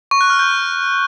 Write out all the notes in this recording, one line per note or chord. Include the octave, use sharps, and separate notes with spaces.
C#6
F#6
F6
G6